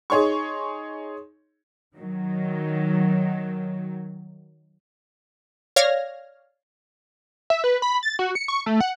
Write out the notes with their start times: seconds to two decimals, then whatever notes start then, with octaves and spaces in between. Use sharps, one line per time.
0.10 D#4 G#4 C#5 C6 C#6
1.97 D#3 F#3
5.76 C#5 D5 F5 F6 G#6 A#6
7.50 E5
7.64 B4
7.82 B5
8.03 A6
8.19 F#4
8.35 C#7
8.48 C#6
8.66 A3
8.80 F#5